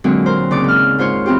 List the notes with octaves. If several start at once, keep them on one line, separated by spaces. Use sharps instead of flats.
A#2 D3 F#3 G#3 C4
A#4 C5
D#2 C#3 D5 D6
G#2 F6
G#2 F4 C5 C#5
E3 C4 F4 G4